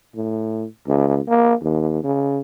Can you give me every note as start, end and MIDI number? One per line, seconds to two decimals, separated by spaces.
0.15 0.65 45
0.87 1.19 37
1.28 1.54 58
1.62 2.02 39
2.04 2.41 49